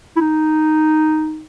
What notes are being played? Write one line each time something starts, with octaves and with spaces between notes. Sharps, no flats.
E4
D#4